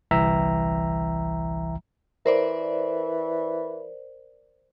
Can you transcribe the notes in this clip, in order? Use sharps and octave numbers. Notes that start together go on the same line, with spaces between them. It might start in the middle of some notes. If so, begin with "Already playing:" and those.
G1 C2 E3 E5 G5 A#5
E3 A#4 C5 D5